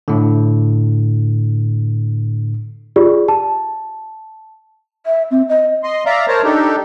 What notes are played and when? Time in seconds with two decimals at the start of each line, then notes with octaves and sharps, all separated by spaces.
0.08 A2 D3
2.96 F4 G4 G#4 D5
3.28 A5
5.06 E5
5.31 C4
5.49 D#5
5.83 D#5 C6
6.06 D5 E5 F5 A#5
6.28 A#4 C5 C#5 A5 A#5
6.44 D4 D#4 G4 A4